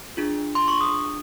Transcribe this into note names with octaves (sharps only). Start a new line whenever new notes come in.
D4 F4 G#4
C6
C#6
D#6